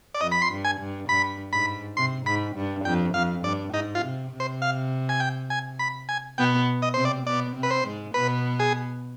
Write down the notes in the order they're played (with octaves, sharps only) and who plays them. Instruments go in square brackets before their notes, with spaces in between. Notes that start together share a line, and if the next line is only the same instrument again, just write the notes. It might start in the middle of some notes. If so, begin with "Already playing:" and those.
[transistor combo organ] D5
[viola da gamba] F2 [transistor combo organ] D#5
[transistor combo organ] B5
C6
[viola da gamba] G2
[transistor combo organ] G#5
[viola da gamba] G2
[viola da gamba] G2 [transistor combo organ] B5
[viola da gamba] G#2 [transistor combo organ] B5
[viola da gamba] C3 [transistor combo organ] C6
[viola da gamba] G#2 [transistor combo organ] B5
[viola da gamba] G2
[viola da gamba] F2 [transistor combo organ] G5
[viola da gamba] F2 [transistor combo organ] F5
[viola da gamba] G2 [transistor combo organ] D5
[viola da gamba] G#2 [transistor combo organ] D#4
[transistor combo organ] F4
[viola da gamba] C3
C3
[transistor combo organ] C5
F5
G#5
G5
G#5
B5
G#5
[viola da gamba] B2 B3 [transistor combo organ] G5
[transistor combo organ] D#5
[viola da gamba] C3 C4 [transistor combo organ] C5
[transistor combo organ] D5
[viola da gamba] B2 B3 [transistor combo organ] D5
[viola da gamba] C3 C4
[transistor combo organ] B4
C5
[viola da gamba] G#2 G#3
[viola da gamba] B2 B3 [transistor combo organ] B4
[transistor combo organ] G#4